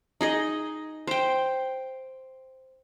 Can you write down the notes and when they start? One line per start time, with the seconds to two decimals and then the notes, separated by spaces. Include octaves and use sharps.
0.21 D#4 G#4 D#5
1.07 C5 G5